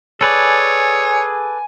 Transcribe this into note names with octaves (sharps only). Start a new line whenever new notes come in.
G#4 A4 B4 C#5 D5 G#5